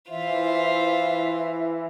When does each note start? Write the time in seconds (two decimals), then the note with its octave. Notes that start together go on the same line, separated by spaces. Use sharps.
0.10 E3 F4 C5 E5